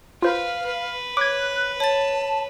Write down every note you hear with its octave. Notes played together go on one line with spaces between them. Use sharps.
F4 B4 C5 F5
B4
C#5 D6 F#6 G#6
C#5 A5 A6